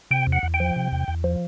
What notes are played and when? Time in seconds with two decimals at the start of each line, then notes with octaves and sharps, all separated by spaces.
0.11 C3 G5
0.27 E2
0.32 F#5
0.43 E2
0.54 G5
0.60 F3
0.76 C3
0.92 E2
1.08 E2
1.24 F3